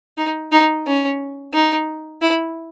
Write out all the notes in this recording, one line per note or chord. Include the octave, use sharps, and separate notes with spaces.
D#4
D#4
C#4
D#4
E4